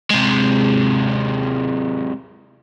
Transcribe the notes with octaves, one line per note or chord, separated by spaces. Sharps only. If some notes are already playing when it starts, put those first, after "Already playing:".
C3 G#3